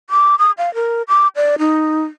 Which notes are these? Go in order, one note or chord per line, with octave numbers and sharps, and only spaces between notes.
D6
D#6
F5
A#4
D6
D5
D#4